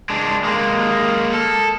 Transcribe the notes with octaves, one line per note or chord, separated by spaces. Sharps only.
G#3 D4
G#3 A#3
A4